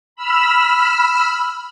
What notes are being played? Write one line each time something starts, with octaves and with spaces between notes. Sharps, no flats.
B5 E6 F6